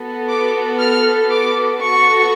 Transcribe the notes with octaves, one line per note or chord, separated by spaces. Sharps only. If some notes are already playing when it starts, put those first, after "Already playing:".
Already playing: B3 F#4 A4
D6
F6
D6
B3 F#4 A4 C#6